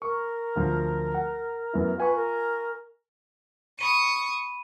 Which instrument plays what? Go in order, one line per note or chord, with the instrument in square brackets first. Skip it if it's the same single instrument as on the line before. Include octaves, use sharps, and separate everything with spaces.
[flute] A#4 [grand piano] C#6
[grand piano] D2 D3 F3
F#5
F#2 B3 E4
[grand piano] F4 G#5 C#6 [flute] B4
[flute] A#4
[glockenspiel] B5 D#7 [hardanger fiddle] C#6 D#6